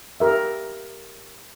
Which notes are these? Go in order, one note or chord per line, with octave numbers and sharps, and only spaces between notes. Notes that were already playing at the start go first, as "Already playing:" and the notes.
G4 A#4 E5